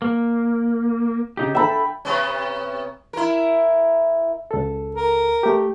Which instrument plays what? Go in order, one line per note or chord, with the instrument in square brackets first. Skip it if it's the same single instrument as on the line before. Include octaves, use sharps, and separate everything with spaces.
[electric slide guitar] A#3
C#3 D#4 G4
[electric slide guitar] A4 E5 [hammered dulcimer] G5 B5
[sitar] C3 B3 C#4
E4 A#4
[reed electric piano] C#2 A4
[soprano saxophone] A#4
[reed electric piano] A3 G4